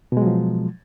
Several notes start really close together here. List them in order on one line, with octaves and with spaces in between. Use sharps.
B2 G#3 F#3 F3